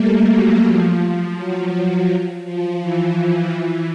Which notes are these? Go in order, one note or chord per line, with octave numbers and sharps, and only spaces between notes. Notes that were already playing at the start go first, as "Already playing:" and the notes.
Already playing: G3 A3 A#3
F#3
F3
F3
F#3
F#3
F3
E3
F3
E3